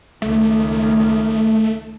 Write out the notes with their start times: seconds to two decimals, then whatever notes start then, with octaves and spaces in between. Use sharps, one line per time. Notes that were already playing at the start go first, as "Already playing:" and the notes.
0.22 C#2 D#3 A3